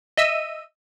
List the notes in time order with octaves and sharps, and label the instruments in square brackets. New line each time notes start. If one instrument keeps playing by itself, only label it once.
[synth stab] D#5 E5 E6 D#7